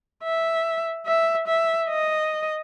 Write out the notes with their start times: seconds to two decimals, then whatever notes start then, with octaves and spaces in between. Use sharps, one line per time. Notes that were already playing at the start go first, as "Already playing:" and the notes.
0.24 E5
1.06 E5
1.48 E5
1.89 D#5